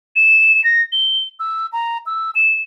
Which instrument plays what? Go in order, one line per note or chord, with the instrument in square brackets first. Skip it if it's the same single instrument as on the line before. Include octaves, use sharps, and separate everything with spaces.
[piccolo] E7
A#6
G7
E6
A#5
E6
E7